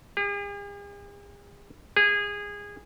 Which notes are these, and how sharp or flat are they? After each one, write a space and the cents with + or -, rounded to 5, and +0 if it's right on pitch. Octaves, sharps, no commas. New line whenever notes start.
G#4 -45
G#4 -20